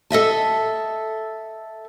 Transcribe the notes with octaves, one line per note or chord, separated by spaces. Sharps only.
A4 D#5 E5 A5